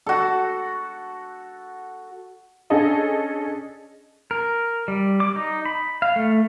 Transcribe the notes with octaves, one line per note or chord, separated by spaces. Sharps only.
F#4 A4
C#4 D4 G#4 A4 D#5 A5
A#4
G3
D6
D#4
B5
F5
A3